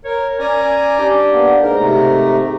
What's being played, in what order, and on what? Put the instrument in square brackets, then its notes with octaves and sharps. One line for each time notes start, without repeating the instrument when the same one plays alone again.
[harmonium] A#4 [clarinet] C#5
[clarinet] C#4 [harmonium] D5 G#5 A#5
[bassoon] D4 [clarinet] G4
[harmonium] A#3 B3
[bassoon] G#2 [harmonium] A#4
[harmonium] C3 A3 [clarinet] A#5